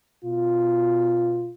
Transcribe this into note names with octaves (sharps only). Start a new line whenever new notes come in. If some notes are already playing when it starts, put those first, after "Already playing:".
B2 F4